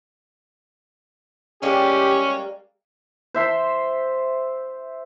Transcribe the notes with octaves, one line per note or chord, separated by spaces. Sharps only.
G3 G#3 A#3 C#4 G4
C5 E5 C6